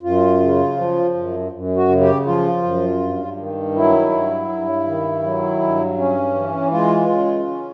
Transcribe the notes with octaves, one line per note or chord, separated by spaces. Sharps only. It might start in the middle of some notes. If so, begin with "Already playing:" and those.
F#2 F4
C#3
F3
F#2
F#2
F#4
C#3
G4
F3 F4
F#2
G2
D#3
F#3 E4
G2
G2
D#3
F#3
G2
C#4
E3
G#3 F4
C#3
C#4